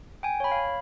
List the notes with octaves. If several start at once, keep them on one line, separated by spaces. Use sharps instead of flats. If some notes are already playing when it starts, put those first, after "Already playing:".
G5 G#5
C#5 B5
F5